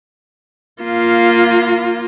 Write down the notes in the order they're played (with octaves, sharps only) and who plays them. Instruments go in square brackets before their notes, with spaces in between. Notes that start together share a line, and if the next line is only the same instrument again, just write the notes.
[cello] A#3 F4